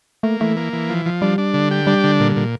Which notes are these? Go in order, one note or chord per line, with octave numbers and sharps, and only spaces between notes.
A3 A#3
E3 A3
A#3
E3
F3
F3
G3 D4
D4
D3
G4
G3 D4
D3
A#2
A#2